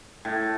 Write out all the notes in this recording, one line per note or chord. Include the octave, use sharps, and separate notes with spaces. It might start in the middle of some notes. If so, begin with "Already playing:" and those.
A2